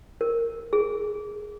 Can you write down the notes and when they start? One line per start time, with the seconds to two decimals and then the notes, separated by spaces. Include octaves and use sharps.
0.21 A#4
0.73 G#4